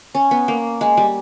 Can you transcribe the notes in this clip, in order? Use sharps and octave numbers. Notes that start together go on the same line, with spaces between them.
C#4
B3
A#3
G#3
G3